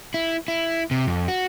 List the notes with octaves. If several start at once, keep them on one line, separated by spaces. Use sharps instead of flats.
E4
E4
C3
F2
F#4